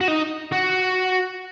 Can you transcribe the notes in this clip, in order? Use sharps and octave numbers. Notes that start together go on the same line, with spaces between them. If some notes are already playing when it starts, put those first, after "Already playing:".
F#4
D#4
F#4